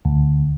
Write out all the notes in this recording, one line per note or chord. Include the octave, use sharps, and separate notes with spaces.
D2